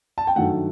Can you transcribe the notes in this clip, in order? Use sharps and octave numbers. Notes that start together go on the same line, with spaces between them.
A5
G5
G2 D#3 F#3 A3 F#5